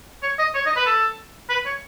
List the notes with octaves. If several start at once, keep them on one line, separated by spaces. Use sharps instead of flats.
C#5
D#5
C#5
D#5
B4
A4
B4
C#5